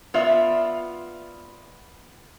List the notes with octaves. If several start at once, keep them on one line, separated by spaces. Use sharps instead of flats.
B3 F4 D5 E5